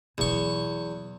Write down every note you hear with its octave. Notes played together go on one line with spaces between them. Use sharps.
E2 B2 F#3 C#6